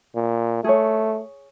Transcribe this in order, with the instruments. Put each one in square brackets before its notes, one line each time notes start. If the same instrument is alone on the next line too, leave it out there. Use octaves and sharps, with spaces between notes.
[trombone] A#2
[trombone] A3 [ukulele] G#4 C#5